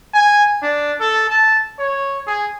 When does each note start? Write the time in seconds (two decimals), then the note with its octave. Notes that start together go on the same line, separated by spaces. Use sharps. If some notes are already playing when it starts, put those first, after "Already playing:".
0.14 G#5
0.63 D4
1.00 A4
1.30 A5
1.79 C#5
2.27 G#4